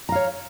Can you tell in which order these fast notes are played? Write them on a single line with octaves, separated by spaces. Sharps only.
A#5 F5 C#5